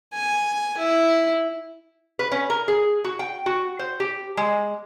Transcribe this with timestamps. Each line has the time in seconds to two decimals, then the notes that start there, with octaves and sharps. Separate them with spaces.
0.14 G#5
0.78 E4
2.19 B4
2.32 C#4
2.50 A#4
2.68 G#4
3.04 F#4
3.19 G5
3.46 F#4
3.79 C5
4.00 G4
4.37 G#3